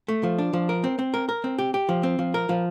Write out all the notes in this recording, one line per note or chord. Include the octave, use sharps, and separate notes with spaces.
A3
F3
D4
F3
A#4
C4
C4
A#4
A#4
C4
G4
G4
F3
C4
F3
A#4
F3